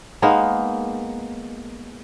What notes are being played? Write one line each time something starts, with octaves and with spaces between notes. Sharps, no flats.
G#3 A#3 B3 D#4